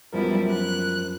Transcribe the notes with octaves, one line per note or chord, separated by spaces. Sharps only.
F#2 F3 G3 B3 E4 A#4
F#6